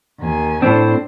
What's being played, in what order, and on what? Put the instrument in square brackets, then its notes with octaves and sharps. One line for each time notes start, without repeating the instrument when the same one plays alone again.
[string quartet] D#2 G#5
[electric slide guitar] A2 C4 [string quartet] D4 C5